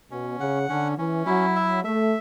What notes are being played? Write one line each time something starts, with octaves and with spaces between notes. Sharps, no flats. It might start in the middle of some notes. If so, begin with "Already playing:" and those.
B2 C#4
C#3 F#5
D3 C#4
E3 C#4
F#3 E4
E5
A3 E5